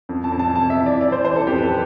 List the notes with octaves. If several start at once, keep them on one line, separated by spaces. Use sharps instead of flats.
F2
A5
F2
A5
C3 A5
E5
E3
D5
E3 D5
C5
E3 C5
A4
F2 G4
B4
A4